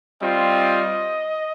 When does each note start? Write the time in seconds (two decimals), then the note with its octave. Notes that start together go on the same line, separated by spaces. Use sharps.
0.22 G3 C4 F4 D#5